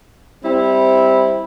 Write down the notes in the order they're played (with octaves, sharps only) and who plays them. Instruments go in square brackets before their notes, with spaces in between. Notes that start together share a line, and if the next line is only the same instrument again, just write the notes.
[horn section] G3 C4 E4